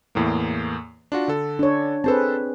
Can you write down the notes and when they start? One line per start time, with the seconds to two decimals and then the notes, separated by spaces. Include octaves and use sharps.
0.15 E2 A2 A#3
1.12 D4 F4 F#4
1.28 D3 A4
1.59 D4 C#5
2.04 C4 G#4 A4 B4 C5 A5